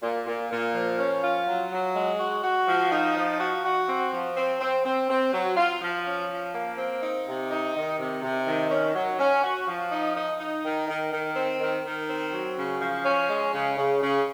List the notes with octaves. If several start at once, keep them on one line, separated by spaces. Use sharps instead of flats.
A#2
A#2
A#2
F3
C#4
F4
F#3
F#3
G#3
F#4
F#4
F3
D#4
F3
F#4
F#4
C4
F3
C4
C4
C4
C4
F#3
F4
F3
C#4
F3
A#3
C4
D#4
C3
D#4
D#3
C3
C3
D#3
C#4
F#3
C#4
F#4
F3
D#4
D#4
D#4
D#3
D#3
D#3
C4
D#3
D#3
C4
F#3
C#3
F3
C#4
G#3
C#3
C#3
C#3